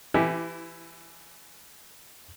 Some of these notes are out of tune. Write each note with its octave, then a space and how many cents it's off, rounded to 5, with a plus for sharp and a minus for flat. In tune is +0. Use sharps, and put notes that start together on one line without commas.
E3 +25 E4 +0 G4 +0